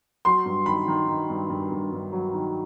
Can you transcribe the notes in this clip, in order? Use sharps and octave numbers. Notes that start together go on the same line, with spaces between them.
F#3 C6
G2
D#3 B5
D#3
D#3
G2
G2
G2
G2
F#3
D#3